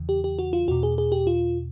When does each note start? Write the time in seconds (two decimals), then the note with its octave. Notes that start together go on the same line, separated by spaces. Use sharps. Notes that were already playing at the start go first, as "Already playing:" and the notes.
Already playing: E2 C#3 E3
0.09 G4
0.24 G4
0.39 F#4
0.53 F4
0.68 E2 B2 F#4
0.83 G#4
0.98 G#4
1.12 G4
1.27 F4